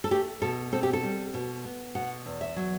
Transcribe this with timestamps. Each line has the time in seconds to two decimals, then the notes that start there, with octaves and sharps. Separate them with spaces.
0.04 A4
0.11 A3 G4
0.42 B2 A4
0.72 C4 A4
0.83 G4
0.93 A4
1.03 G3
1.34 B2
1.65 B3
1.95 B2 F#5
2.26 E2
2.41 E5
2.56 F#3